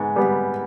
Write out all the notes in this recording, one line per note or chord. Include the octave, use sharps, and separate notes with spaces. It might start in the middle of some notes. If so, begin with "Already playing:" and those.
Already playing: G#2 B3
G3 B3